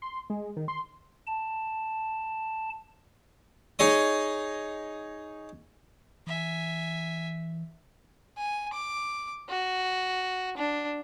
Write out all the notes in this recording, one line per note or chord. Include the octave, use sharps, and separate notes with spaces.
C6
G#3
D#3
C6
A5
D#4 G#4 C#5 D#5 D#6
E3 E5 G#5
G#5
D6
F#4
D4